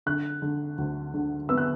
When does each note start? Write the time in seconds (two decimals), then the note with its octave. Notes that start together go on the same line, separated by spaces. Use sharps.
0.06 D3 F#6
0.42 D3
0.78 D2
1.14 D3
1.49 B3 E6
1.57 F#6